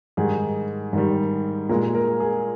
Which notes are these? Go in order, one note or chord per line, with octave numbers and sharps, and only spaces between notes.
G#2 D#3 G3 G#4
G#2 D#3 G3
A#2 G#3 A#4
A#4
G#4